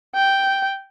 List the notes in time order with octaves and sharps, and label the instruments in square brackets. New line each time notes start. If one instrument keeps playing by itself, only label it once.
[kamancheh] G5